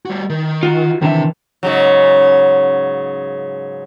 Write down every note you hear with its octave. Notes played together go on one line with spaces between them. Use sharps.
G3 F#4
D#3
F4 F#4
C3 D#3 E3 D4 E5
G#2 C#3 F#3